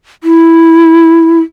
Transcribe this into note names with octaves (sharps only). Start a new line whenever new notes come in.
E4